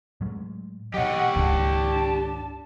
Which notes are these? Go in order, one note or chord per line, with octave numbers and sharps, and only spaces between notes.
A2 F#3 G#3
B2 F#3 G4 C#5 D#5 F#5
C#2 G#2 D#3 D4 A5